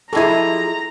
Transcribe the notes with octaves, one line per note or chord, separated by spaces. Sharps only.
F3 G#3 E4 G4 A4 A#5